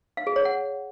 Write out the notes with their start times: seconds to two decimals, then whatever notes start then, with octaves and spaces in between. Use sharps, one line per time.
0.17 F5
0.27 G#4
0.36 C#5
0.45 F#5